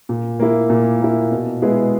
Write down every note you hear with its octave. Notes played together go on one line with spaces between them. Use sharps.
A#2
A#3 E4
A#2
A#3 E4
B2
G#3 B3 E4 G#4